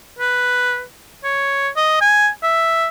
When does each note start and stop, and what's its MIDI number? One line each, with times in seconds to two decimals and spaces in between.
0.19 0.83 71
1.24 1.69 73
1.76 1.97 75
2.01 2.29 80
2.43 2.88 76